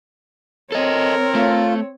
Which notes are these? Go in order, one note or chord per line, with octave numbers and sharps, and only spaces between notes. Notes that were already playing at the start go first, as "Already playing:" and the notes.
C4 A4 A#4 C#5 D#5
A3 F4